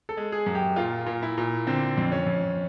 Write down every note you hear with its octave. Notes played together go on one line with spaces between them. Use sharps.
A4
G#3
G#4
F#2
G4
A#2 F4
A#2
E4
A#2
D3 C4
F2
C#4
F2